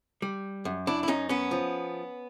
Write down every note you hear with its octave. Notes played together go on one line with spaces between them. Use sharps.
G3
F#2
D4 E4
E4
F#2 C#4 D#4
B3 C#4
F3